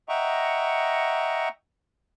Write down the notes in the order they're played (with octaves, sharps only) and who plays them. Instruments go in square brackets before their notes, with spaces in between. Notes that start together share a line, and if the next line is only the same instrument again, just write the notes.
[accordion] D#5 E5 F#5 G5 A#5 C#6